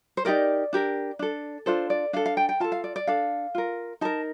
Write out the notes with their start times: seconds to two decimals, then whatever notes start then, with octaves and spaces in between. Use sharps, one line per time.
0.17 C5
0.25 D#4 G4 A#4 D5
0.73 D4 G4 A#4
1.19 D4 A4
1.66 D4 F4 A4 C5
1.90 D5
2.13 D4 A4 F5
2.26 F5
2.37 G5
2.49 G5
2.60 F4 A4 A5
2.72 F5
2.84 D5
2.96 D5
3.07 D4 A4 F5
3.55 F4 A#4
4.01 D#4 A#4 A5